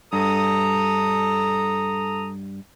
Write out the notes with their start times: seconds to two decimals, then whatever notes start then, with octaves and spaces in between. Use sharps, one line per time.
0.13 G2 A4 A#5 D#6